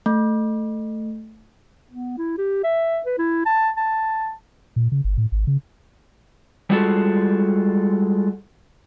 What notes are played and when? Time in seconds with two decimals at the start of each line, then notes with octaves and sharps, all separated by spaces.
0.06 A3
1.91 B3
2.18 E4
2.38 G4
2.64 E5
3.06 B4
3.18 E4
3.46 A5
3.77 A5
4.76 A#2
4.92 C#3
5.04 G1
5.18 A2
5.32 G#1
5.47 C#3
6.70 G3 G#3 F4 F#4 G#4 A4